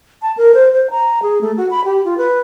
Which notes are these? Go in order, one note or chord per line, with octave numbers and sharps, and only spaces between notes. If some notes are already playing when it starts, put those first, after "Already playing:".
A5
A#4
C5
C5
A#5
G#4
A3
F#4
B5
G4
F4
B4